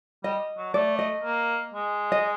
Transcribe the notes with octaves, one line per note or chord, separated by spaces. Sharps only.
G3 D#5
F#3
A3 D5
D#5
A#3
G#3
D#5